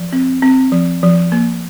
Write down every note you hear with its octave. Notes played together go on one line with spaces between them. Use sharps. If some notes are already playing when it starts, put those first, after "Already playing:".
Already playing: F3
C4
C4
F3
F3
A#3